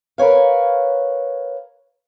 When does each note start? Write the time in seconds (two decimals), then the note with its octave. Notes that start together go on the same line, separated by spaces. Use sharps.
0.18 A#4 B4 C#5 F5